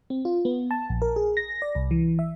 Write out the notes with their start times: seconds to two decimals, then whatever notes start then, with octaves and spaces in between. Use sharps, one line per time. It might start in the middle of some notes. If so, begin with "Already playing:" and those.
0.10 C4
0.25 F4
0.45 B3
0.71 A5
0.89 A#1
1.02 A#4
1.16 G#4
1.37 A#6
1.62 D5
1.75 C2
1.91 E3
2.19 E5